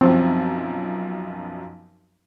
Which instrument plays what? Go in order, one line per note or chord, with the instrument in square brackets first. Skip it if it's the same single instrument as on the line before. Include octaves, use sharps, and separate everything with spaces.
[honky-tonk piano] B1 F#2 F3 [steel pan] C4